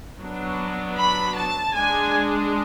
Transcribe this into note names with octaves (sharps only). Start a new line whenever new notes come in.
F#3 B3 D4
B5
A5
G#3 D4 G#5